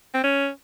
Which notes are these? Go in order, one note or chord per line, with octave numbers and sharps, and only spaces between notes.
C4
C#4